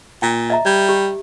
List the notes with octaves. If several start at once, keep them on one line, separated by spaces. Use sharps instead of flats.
A#2 G5
D#5 E5 A#5
G3 D5
G4